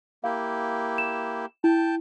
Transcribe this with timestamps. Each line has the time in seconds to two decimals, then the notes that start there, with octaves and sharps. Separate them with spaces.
0.24 A#3 E4 G4 F5
0.98 E7
1.64 E4 G5 A5